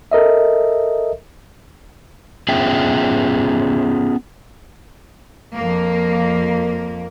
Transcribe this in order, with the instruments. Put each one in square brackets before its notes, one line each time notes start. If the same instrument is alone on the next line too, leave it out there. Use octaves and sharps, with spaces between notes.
[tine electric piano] A4 A#4 D#5 E5
[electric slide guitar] B3 C#4 F4 G#4 E5 G5
[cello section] F2 A#3